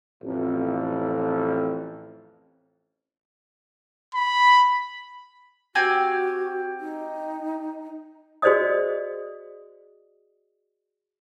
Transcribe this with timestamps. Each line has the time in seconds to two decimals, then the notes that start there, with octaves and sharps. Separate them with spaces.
0.23 A1 F2
4.15 B5
5.75 C4 F#4 G4 G#5
6.80 D#4
8.42 F#4 G#4 C5 D5 D#5 D#6